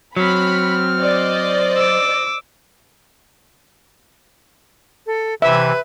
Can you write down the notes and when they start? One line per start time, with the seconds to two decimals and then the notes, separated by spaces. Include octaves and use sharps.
0.17 F#3 C4 B5 F6
1.01 C5 D5 D#5
1.76 D6 E6
5.06 A4
5.42 C3 E3 B4 E5